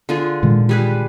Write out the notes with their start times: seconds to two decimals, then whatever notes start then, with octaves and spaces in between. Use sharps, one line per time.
0.09 D3 F4 G#4
0.43 A#2 D#3 G#3
0.69 G3 G#4 B4